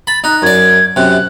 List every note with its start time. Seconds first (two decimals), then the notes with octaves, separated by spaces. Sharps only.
0.07 B5 A6
0.24 D#4 F#6
0.42 F#2 D5 G#6
0.96 F#2 C3 F#6